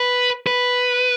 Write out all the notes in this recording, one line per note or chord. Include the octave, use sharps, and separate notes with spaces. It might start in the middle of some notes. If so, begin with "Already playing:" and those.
Already playing: B4
B4